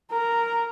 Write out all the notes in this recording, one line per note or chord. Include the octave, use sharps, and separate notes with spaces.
A#4